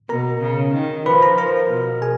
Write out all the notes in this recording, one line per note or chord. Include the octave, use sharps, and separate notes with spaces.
B2 A#4 A#5
C#3
D#3
F3 B4 B5
A#4 A#5
F3 A#4 A#5
B2
G#4 G#5